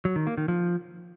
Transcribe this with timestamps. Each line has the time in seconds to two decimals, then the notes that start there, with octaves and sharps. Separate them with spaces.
0.05 F#3
0.16 D#3
0.27 A#3
0.37 D#3
0.48 F3